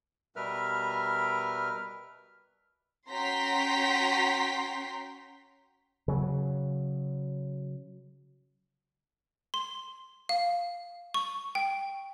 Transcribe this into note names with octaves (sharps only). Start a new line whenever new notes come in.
B2 G3 A#4 B4 E5 F6
C#4 F#4 G5 A#5 C6 B6
C#3 F#3
C6
F5
C#6
G5